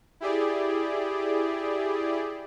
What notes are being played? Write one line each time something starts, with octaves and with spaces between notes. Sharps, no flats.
E4 G4 G#4 D5